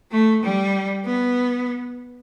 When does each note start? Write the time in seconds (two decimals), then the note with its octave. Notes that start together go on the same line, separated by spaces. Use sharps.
0.11 A3
0.43 G3
1.05 B3